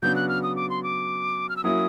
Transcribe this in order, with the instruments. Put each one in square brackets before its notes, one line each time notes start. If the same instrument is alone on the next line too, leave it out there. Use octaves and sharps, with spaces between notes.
[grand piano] C#3 F#3 B3 D4 [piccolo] G6
[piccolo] F#6
F6
D#6
D6
C6
D6
F6
E6
[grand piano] F#3 A#3 C#4 E4 [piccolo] D#6